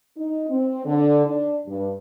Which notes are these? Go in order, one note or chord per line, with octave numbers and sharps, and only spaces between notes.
D#4
C4
D3
D4
G2